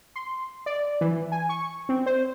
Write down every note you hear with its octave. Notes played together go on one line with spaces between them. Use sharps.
C6
D5
E3
G#5
C#6
C4
C5